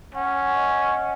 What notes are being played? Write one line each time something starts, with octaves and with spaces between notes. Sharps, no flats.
C#4 F#5
G#5
F#5
D#5